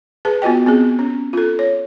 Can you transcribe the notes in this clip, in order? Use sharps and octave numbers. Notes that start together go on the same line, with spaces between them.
G#4 B4 A5
B3 F4 F#4 D#5 G5
B3 C4 G#4
C#4
F4 A4
C#5